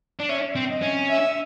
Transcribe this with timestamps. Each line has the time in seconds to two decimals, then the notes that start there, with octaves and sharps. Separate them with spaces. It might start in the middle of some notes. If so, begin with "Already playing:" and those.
0.19 D4
0.29 C#4 E5
0.56 C4
0.70 D#5
0.82 C#4
1.09 E5